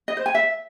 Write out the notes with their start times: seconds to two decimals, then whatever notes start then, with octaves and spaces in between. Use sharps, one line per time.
0.08 D#5
0.17 C5
0.26 G#5
0.35 E5